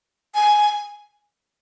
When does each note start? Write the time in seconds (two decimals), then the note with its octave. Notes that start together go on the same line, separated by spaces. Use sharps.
0.35 G#5